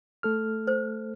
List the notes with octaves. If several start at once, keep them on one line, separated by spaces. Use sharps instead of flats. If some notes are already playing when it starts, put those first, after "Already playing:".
A3 A4 F6
C5